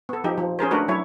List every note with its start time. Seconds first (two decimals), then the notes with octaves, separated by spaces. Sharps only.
0.09 B3 A4
0.24 F3 D#4 G4
0.38 F3
0.59 C#4 G#4 A#4 C5
0.71 A3 D4 F#4 A#4 B4
0.88 F#3 E4 C#5